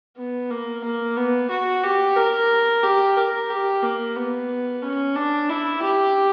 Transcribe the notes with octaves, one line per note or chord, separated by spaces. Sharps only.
B3
A#3
A#3
B3
F#4
G4
A#4
G4
A#4
G4
A#3
B3
C#4
D4
E4
G4